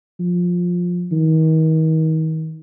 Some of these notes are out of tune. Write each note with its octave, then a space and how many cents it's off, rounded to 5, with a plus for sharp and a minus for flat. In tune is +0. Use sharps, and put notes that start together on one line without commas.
F3 +15
D#3 +35